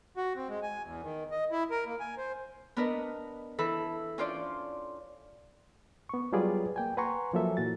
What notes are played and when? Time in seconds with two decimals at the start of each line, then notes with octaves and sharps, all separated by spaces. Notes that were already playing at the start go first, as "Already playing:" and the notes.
0.17 F#4
0.36 C4
0.48 G#3
0.62 G#5
0.83 E2
1.03 D#3
1.31 D#5
1.51 E4
1.71 A#4
1.87 A#3
2.00 G#5
2.18 C5
2.76 B3 D4 A#4 B4 D#5
3.58 E3 A4 B5
4.18 C#4 D4 F4 C5 D5
6.09 B3 C#6
6.33 F#3 G3 F4 G#4 B4 D5
6.76 A#3 G5 G#5
6.97 B4 F#5 G#5 A#5 C6 C#6
7.33 F3 F#3 A#3 A4 E5
7.57 A#2 E3 F#4 A6